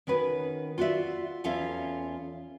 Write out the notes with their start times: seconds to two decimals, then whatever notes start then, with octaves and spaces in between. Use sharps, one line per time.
0.07 D#3 C#4 F#4 B4
0.78 F4 F#4 D5 E5
1.44 E2 C#4 F4 A4 E5 F5